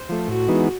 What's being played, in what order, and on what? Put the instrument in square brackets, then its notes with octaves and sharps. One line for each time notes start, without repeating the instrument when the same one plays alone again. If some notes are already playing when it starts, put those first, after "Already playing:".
Already playing: [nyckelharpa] C5
[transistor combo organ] F3 A3
[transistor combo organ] A2 [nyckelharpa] F#4
[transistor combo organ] E3 G#3 B3 D#4